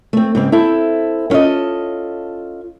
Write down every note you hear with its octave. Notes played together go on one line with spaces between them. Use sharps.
A3 C4
G#2 C#3 C4
C4 E4 A4
B3 C#4 F4 A4 D#5